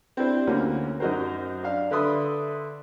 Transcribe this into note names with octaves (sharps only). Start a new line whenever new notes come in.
C4 D4 E4 G4 C5
D2 A#3 C#4 F#4
F#2 D#4 F#4 A#4 C5
D4 F5
D3 B4 D5 E5 C6 D#6